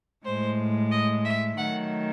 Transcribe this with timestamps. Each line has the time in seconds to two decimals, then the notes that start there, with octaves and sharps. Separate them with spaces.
0.25 A2 G#3 C5
0.91 D#5
1.24 E5
1.57 D#3 F#3 A3 F#5